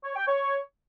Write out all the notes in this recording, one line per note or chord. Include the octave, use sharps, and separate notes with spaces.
C#5
G5
C#5